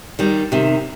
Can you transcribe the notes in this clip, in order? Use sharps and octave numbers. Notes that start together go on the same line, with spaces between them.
D#3 G3
C3 D#3